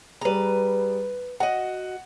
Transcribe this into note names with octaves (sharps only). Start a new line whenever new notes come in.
G3 G#4 B4 A#5
F#4 D#5 F#5